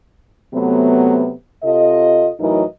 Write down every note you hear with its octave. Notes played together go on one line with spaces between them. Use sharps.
C3 F#3 A3 B3
C3 F4 A4 D#5
A2 E3 F#3 D#4 A#4 D#5